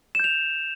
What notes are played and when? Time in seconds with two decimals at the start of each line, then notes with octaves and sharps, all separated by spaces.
0.15 E7
0.20 G6
0.24 F7